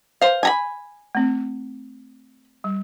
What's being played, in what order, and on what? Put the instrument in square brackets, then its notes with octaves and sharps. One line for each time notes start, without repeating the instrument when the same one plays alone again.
[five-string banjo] C5 F5
G#5 A#5 B5
[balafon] A3 C4
G3